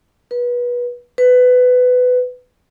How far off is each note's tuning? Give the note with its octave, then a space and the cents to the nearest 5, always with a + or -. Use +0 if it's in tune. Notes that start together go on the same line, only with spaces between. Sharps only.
B4 -25
B4 +20